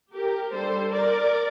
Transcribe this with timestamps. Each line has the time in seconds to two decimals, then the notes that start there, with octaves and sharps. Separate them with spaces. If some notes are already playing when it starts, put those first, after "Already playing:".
0.14 G4 A#4
0.51 G3 D4 A4 C5
0.89 A#4 D5